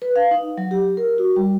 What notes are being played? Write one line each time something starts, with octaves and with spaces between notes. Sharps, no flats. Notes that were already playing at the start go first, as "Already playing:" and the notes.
B4
F5
D#4
F#3
G4
A#4
F#4
G3